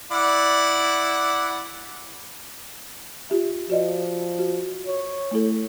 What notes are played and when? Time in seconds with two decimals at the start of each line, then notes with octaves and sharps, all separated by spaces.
0.12 E4 D5 F#5
3.30 F4 G4 E5
3.70 F3 F#4 D5 D#5
4.39 F#4
4.86 C#5
5.31 A3 E4 A4